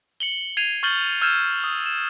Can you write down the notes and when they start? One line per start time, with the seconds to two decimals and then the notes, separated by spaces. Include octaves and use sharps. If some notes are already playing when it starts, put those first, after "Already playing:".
0.20 C#7 F#7 G7
0.57 G#6 C7 D#7 F7
0.83 C#6 F6 G6 A6 F#7 G7
1.22 E6 F6 G6 G#6 E7
1.64 D#6
1.86 E7